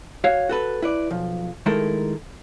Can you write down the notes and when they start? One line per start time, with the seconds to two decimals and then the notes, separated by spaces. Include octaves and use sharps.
0.24 F#4 C#5 F5
0.49 F#4 A4 B4
0.82 E4 B4 D5
1.11 B1 F3
1.66 D#3 G#3 A3 E4 A4 A#4